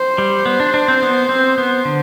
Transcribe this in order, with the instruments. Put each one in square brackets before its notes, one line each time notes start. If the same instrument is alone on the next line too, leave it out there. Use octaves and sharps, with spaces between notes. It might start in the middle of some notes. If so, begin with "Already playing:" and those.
Already playing: [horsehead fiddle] C5
[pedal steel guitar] G3
B3
D4
D4
C4
B3
C4
B3
D3